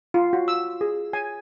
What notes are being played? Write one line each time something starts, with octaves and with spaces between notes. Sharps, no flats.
F4
F#4
E6
G#4
G#5